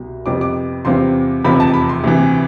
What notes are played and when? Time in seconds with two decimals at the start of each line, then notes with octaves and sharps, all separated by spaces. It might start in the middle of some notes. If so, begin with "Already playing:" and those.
Already playing: C2 B2
0.26 F2 C3 G3 B3 D6
0.41 D6
0.85 E2 C3 G3 C4 F4 C6
1.45 F1 E2 C3 F3 B5
1.60 A5
1.74 B5
1.89 C6
2.04 D2 C3 E3